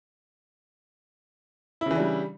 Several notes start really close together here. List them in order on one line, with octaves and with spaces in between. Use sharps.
E4 C#3 E3 D4 G3